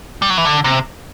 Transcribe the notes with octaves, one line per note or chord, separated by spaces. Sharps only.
G3
F#3
E3
D3
C3